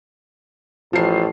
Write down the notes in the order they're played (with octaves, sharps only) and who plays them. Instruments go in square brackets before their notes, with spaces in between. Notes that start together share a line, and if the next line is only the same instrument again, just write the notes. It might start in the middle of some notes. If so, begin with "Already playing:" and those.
[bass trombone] A1 [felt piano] F3 C7